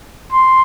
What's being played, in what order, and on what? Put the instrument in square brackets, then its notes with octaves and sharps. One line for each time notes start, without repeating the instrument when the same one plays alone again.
[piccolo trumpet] C6